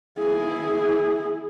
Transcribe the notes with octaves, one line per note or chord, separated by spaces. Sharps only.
E4 G#4